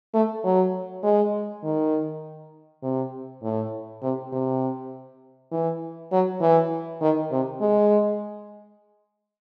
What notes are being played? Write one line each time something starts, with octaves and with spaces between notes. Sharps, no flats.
A3
F#3
G#3
D#3
C3
A2
C3
C3
E3
F#3
E3
D#3
C3
G#3